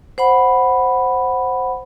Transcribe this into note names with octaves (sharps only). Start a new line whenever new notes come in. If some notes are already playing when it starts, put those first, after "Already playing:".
C5 F#5 B5